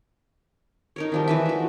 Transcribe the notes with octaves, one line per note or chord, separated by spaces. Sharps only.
D#4 A#4 C#5
D#3 F3 G3
E3 B4 E5
A3 F#4